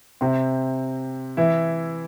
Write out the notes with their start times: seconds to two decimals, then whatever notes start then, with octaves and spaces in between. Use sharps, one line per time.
0.21 C3 C4
1.37 E3 E4